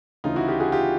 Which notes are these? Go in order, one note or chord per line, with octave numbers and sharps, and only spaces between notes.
D2 C#3 E3 D#4 F4
E4 F#4
F4 G4
F#4 G#4
F4 G4